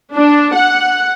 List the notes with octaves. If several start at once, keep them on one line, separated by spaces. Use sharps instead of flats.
D4
F#5